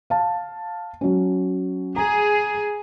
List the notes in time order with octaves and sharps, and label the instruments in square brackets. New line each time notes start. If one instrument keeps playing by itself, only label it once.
[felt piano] F5 A5
F#3 C#4
[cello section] G#4 [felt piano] A#5